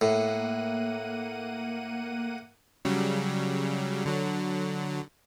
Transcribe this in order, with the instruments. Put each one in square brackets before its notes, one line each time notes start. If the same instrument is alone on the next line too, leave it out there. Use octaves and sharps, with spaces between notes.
[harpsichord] A2 [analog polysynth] A#3 F#5 D#7
[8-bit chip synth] C#3 F#3 G3
D3 F#3